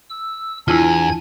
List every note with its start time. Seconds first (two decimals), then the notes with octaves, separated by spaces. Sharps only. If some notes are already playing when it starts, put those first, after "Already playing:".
0.10 E6
0.68 E2 D4 E4 F4 G#5 G#6